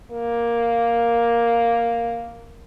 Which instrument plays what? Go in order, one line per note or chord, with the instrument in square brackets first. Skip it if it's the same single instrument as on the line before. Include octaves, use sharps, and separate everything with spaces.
[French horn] A#3